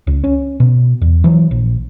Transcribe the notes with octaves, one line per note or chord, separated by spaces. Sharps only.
C#2
C#4
B2
E2
E3 F#3
A#1